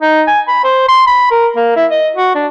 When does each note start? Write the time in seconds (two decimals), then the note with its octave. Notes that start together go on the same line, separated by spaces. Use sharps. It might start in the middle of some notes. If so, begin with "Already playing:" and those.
0.02 D#4
0.27 G#5
0.48 B5
0.64 C5
0.88 C6
1.07 B5
1.31 A#4
1.57 A#3
1.76 E4
1.91 D#5
2.16 F#4
2.35 D4